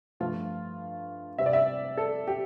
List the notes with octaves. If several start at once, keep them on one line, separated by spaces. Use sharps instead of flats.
G2 F3 A3 F4
C3 G3 C4 E5
D5
E5
A4
G4